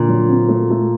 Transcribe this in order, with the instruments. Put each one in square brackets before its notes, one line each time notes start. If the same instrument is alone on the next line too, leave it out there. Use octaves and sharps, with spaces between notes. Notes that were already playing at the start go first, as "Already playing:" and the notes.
Already playing: [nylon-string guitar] A#2 [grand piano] D3
[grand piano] F#3
C4
A3
A3